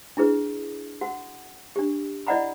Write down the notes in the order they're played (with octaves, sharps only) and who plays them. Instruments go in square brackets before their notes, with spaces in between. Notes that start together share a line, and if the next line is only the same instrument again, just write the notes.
[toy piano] D4 E4 G#4 B4
F#4 F#5
D4 G4
E4 D5 D#5 F#5 A#5 B5